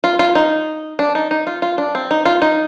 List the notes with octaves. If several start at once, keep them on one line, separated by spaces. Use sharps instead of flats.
F4
F4
D#4
D4
D#4
D#4
F4
F4
D4
C4
D#4
F4
D#4